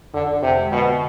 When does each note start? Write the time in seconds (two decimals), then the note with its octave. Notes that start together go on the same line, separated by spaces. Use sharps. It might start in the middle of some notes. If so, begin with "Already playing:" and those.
0.14 F2 D3
0.43 C3
0.57 D3 G#3
0.72 B2